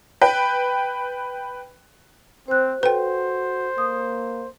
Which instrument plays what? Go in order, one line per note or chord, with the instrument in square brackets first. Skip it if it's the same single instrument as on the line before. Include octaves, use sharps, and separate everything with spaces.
[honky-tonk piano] B4 G5
[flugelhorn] C4 [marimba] C5 F#6
[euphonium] F#4 [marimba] A4 [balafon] B4 G5 [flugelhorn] C5
[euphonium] A#3 [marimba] D#6